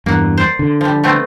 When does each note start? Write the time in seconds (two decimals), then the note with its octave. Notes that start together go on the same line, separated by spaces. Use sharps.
0.06 E2 G2 A#3 F#5
0.37 C5 D5
0.59 D3
0.81 F3 G3
1.04 A3 B3 C4